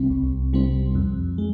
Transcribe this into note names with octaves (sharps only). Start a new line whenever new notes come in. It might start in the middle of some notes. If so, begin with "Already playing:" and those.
Already playing: C2 C3 G3 C4
C2
C3 G3 C4
F2
G#3